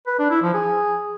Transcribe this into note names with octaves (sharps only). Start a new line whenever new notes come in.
B4
D4
E4
F3
G#4